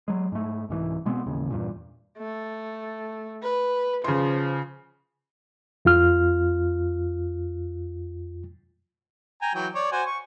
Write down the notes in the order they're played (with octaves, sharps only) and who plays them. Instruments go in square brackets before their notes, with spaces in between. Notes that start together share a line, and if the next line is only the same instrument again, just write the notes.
[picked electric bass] F#3 G#3
G#2 A3
C2 G#2 E3
B2 G#3 B3 C4
A1 D#2 C#3
E2 G2 A#2
[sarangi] A3
B4
[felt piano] C#3 C6 [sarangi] F3
[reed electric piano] F2 F4 F6
[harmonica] G5 G#5 A#5
E3 F#3 G5
C#5 D5
F#4 C5 G#5
C#6